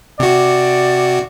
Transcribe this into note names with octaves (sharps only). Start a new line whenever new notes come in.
C3 F#4 D5